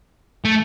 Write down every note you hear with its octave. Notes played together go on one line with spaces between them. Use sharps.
A3